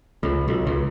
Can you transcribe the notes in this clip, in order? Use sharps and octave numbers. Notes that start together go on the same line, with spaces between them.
C#2
B1
C#2